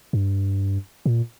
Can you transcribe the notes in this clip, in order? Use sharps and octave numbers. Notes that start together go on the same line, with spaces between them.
G2
A#2